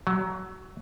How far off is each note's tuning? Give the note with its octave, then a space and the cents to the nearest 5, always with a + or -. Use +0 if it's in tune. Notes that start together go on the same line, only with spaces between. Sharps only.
F#3 +20